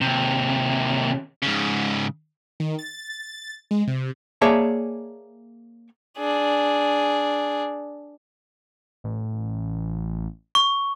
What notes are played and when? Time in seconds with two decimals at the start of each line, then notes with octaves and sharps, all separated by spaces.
0.01 D#2 C3
1.42 G#2 C#3
2.60 D#3
2.79 A6
3.71 G#3
3.87 C3
4.42 A#3 G#4 C#5 D5 E5 A5
6.18 D4 G#4
9.04 A1
10.55 C#6